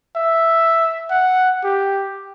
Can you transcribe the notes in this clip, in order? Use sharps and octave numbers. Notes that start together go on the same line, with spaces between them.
E5
F#5
G4